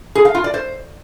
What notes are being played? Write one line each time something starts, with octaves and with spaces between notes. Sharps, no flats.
G#4
F5
F4
D5
C5